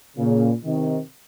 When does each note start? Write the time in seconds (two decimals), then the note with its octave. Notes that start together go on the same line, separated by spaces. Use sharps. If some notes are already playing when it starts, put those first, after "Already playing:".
0.16 A#2 C#3
0.65 C3 D#3